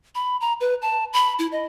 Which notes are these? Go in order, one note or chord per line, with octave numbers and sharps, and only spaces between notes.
B5
A#5
B4
A5
B5
E4
D#5